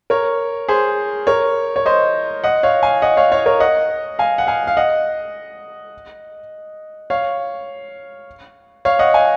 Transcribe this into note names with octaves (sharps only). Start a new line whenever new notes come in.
A#4 C#5
G#4 C5
A#4 C#5
C#5
C5 D#5
D#5 F#5
C#5 F5
F5 G#5
D#5 F#5
C#5 F5
C#5 F5
A#4 C#5
D#5 F#5
F5 G#5
F#5
F5 G#5
F5
D#5 F#5
C#5 F5
C#5 F5
D#5 F#5
F5 G#5